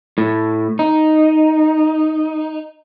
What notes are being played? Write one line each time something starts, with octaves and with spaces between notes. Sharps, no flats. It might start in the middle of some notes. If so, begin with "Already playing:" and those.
A2
D#4